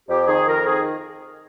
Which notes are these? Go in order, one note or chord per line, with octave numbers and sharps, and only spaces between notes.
F2 G4
D#3 G#4
F2 A#4
D#3 G#4